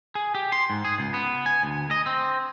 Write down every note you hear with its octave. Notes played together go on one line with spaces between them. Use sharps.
G#4
G4
C6
G#2
G#4
C#2
B3
G#5
D2
D#5
C4